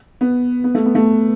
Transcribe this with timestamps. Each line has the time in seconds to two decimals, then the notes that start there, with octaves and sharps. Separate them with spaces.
0.21 B3
0.64 B3
0.75 A3
0.86 B3
0.95 A3